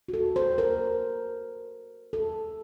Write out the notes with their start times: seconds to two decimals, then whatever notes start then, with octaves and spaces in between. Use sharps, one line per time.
0.08 F#4
0.14 A4
0.36 C5
0.58 A#4
2.13 A4